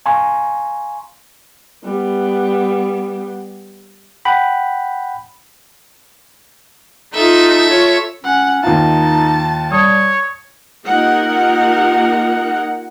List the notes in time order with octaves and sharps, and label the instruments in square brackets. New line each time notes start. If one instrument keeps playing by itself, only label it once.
[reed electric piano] F5 G#5 A#5 C6 C#6
[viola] G3 B3
[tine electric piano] F#5 G5 B5
[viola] D#4 F4 [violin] A4 E5
[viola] F4 C#5
[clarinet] C#4 [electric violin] F#5
[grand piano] D#2 F4 [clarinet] D#4 [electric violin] A5
[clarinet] G3 [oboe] C#5 [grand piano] D#6
[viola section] A#3 D#4 F4 G4 A#4 F#5